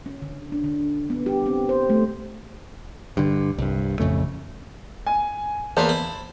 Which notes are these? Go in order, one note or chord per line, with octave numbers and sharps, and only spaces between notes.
C#4
D3
D4
D3
B3
G4
C4
C5
A3
G2 D3
C2 G2
A1 F2 C#3 A3
G#5
E2 A#3 B4 C5 A5
E4